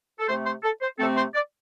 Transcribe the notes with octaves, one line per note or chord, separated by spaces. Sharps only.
A4
C3 A3 C4 C5
C5
A4
C5
C3 A3 C4 A4
C5
D5